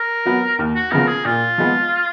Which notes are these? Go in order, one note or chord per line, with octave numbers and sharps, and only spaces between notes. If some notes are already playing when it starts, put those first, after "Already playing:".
Already playing: A#4
F#3 B3
D#2
F#4
C#3 F3 B3 A#4
G#4
A#2 F4
F3 G#3 B3